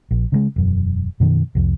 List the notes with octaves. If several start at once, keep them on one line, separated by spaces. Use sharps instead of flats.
A#1
C#3 F#3 G#3
E1 F#2
F#2 B2 D#3 F3
C2 F2